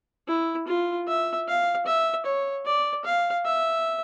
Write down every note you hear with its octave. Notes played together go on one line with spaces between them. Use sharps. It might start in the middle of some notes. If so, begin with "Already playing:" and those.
E4
F4
E5
F5
E5
C#5
D5
F5
E5